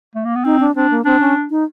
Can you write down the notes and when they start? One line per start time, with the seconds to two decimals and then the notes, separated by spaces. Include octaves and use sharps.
0.16 A3
0.25 A#3
0.36 B3
0.45 C4 D#4
0.60 D4
0.75 C4 D4
0.91 A#3
1.05 C4 D4
1.20 C#4
1.51 D#4